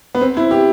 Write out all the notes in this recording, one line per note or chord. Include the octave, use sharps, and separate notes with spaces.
B3
C4
E4
G4